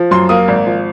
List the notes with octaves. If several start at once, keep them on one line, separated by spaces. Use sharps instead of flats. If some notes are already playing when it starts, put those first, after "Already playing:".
Already playing: F3
F#2 C6
A#3 D#6
G#1
F3